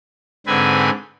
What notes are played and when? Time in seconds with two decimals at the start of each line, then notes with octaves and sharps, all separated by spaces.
0.47 G#2 D3 C4 B4 G#5